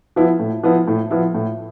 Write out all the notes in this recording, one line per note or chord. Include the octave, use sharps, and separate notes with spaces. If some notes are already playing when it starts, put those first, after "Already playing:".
F3 B3 E4
A2
F3 B3 E4
A2
F3 B3 E4
A2